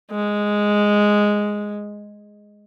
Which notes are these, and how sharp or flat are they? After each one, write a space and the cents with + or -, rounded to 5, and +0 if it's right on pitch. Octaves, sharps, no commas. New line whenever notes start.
G#3 -5